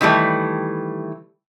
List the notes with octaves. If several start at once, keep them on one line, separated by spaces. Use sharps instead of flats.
D#3 E3 G3 A3